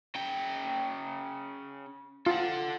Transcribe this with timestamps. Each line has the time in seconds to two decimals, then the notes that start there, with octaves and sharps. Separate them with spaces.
0.15 C#3 G5
2.26 F4 A4 F#5